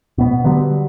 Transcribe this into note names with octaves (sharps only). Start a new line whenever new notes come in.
B2 B3
D3 F#3 G3 B3